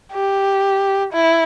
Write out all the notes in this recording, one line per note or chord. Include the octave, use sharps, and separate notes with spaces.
G4
E4